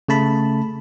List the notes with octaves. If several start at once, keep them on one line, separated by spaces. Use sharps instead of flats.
C#3 A3 A5 B5